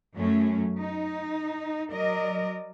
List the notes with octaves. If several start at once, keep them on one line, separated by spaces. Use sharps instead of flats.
F#2 F#3 A3 C#4
D#4
F#3 A#4 D5 D#5